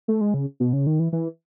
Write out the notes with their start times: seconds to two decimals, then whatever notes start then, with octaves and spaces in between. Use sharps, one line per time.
0.08 A3
0.21 G#3
0.34 C#3
0.60 B2
0.73 C#3
0.87 D#3
0.99 E3
1.13 E3